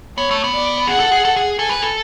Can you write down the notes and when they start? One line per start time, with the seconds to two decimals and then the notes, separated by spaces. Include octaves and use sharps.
0.17 B3 C#5
0.31 A3
0.44 B3
0.53 D5
0.87 G#4 F#5
1.00 A4
1.12 G#4
1.25 A4
1.36 G#4
1.58 A4 G#5
1.69 B4
1.82 A4